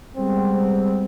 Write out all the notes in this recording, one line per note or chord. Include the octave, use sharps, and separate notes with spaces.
G3 G#3 B3 C4